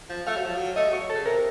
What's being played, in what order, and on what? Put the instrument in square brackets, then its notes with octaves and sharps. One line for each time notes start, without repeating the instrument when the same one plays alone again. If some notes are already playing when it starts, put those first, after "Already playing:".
[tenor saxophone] F3
[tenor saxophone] A3 [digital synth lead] F5
[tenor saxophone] F#3
F3
F#3
[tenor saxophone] A3 [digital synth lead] D#5
[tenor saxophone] F#3
[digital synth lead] C#5
[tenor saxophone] C#3 [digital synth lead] A4
[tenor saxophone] C3 [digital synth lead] A#4